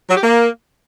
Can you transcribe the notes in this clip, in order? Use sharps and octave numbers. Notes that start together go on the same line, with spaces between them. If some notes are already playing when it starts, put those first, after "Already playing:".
F#3
G4
A#3